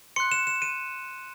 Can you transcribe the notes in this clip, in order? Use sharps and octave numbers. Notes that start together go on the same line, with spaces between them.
C6 F#6 C#7
E7
E7
D#7